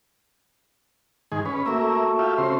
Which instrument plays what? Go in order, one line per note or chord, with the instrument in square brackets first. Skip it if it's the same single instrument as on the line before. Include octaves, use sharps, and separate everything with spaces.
[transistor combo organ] G#2 D#3 G#4
C#4 B4
[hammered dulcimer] A3 F#4 [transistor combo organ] A#3 E5
[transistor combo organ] F4 G4 E5
C#3 C4 C5